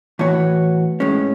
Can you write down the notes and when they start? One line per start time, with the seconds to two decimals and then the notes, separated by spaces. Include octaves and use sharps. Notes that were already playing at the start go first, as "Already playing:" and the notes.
0.19 A2 E3 B3 F#4 C#5
1.00 A2 G#3 C#4